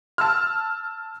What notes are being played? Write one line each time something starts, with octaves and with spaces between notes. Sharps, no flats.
A5 E6 F6